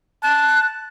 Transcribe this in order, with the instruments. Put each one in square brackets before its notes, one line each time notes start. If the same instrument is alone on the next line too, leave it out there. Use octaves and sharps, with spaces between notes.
[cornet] A5 [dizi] F#6